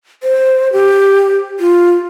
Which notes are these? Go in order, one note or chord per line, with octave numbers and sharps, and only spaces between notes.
C5
G4
F4